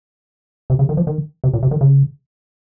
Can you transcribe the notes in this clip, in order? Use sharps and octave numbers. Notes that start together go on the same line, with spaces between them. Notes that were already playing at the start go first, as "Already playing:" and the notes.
C3
C#3
D#3
F3
D#3
C3
A#2
C3
D#3
C#3